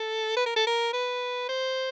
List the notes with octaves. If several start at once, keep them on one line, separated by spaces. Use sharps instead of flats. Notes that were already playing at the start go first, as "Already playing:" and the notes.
Already playing: A4
B4
A#4
A4
A#4
B4
C5